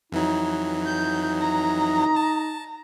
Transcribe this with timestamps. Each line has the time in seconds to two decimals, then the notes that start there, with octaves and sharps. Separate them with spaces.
0.12 F2 E3 F#3 D#4
0.86 G6
1.40 A#5
2.16 A5